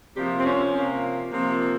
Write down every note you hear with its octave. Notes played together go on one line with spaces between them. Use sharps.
C3 F3 A#3 G4
C4
C#4
C3 F3 A#3
C3 F3 A#3